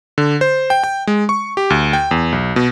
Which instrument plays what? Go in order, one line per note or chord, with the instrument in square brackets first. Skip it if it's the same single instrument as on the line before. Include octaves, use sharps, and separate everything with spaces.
[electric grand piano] D3
C5
G5
G5
G#3
C#6
G4
D2
G5
E2
B1
B2